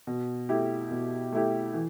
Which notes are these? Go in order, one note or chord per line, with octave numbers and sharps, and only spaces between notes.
B2
A3 E4 G4
B2
A3 E4 G4
E3